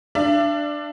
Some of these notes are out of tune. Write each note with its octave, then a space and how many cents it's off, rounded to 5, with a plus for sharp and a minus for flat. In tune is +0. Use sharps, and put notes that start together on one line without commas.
D4 +10 E5 +45